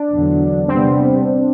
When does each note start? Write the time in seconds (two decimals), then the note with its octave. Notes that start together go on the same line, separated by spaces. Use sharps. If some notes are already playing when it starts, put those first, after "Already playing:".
Already playing: D4
0.11 E2 D3 F#3
0.68 C3 G3 B3 C4